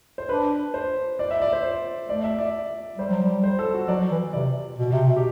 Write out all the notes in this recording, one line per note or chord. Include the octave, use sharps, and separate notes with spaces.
C5
D4 B4
C5
D5
E5
D5
C5
C5
A3 D5
E5
D5
G3 C5
F#3
G3
C5
A4
F#4
F#3 D5
E3
C3 D5
B2
C3
B2
G4